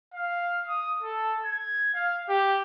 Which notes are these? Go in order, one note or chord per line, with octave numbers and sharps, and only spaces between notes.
F5
D#6
A4
G#6
F5
G4